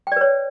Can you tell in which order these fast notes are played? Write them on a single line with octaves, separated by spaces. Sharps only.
G5 D5 B4 C#5